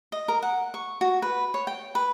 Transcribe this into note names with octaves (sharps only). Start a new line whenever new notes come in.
D#5
A#4
F#5
C#6
F#4
B4
C#5
G5
B4